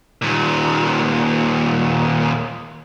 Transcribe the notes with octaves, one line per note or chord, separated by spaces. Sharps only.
D#2 A#2